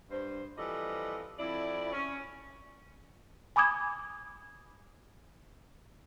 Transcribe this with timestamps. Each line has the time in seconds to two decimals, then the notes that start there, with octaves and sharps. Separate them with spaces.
0.09 G2 C5
0.57 E3 F3 G3 C4 A4 D#5
1.39 F2 E4 D5
1.92 C#4
3.56 G#5 B5 D6 D#6 G#6